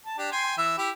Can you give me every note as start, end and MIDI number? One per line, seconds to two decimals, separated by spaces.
0.06 0.17 81
0.18 0.31 62
0.18 0.31 67
0.32 0.54 79
0.32 0.54 80
0.32 0.54 84
0.58 0.74 52
0.58 0.74 76
0.78 0.90 64
0.78 0.90 67